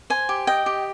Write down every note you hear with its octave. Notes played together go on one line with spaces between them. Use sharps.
C5 G#5
G4
D#5 G5
G4